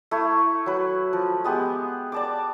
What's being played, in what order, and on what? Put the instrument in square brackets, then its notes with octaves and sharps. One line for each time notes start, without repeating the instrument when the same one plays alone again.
[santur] A3 E4
F#3 B4
F3
G#3 B3 G4
D5 A5 D6